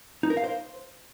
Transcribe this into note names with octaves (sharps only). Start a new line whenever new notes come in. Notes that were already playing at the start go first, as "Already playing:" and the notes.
D#4
A#4
F5
C5